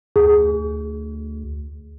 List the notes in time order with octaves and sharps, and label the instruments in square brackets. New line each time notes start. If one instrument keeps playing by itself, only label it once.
[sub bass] D2 [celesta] G#4